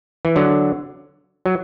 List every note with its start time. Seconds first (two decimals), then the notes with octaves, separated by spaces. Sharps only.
0.25 E3
0.36 D3 F#3
1.46 F#3